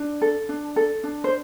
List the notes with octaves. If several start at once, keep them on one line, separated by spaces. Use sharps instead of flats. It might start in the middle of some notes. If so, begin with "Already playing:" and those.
Already playing: D4
A4
D4
A4
D4
C5